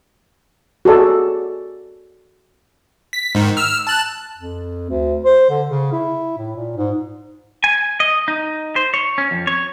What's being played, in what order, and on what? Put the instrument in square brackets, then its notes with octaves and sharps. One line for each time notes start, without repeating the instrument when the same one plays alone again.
[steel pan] F#4 G#4 A4 D5
[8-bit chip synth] B6
G#2 D#3
E6 F6
A5 F#6
[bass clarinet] F2
D2
C5
D3
C#3
E4
A2
A#2
G#2
[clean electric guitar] G#5
D#5
D#4
C5
C#5
C#4
F2
C#5